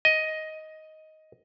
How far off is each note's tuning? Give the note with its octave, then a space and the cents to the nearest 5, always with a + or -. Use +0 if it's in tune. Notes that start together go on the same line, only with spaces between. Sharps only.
D#5 +10